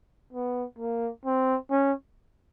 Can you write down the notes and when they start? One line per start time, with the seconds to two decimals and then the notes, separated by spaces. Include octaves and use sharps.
0.33 B3
0.79 A#3
1.25 C4
1.71 C#4